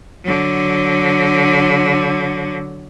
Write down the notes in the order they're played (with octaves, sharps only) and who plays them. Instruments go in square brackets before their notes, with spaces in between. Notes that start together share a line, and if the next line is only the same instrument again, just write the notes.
[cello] D3 F#3